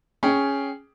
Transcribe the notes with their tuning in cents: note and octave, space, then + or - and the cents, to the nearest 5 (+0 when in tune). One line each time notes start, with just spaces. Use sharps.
C#4 +0 G#4 +0 G5 +0